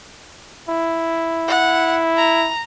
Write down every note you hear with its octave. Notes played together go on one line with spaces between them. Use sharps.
E4
F#5
A#5